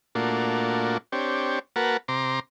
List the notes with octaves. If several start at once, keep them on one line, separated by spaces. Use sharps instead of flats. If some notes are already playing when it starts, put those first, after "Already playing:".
A#2 A3 A#3 D4 F4 F#4
C4 D4 G4 C#5
A#3 F#4 A#4 B4 F#5 A5
C3 A#5 C6 D6